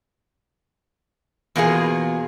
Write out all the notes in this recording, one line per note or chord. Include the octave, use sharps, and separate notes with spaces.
E2 B2 A#3 F4 G#4